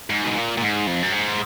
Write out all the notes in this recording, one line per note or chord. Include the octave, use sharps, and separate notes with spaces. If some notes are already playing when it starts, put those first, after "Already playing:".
G#2
B2
A#2
A#2
G#2
F2
F#2
G#2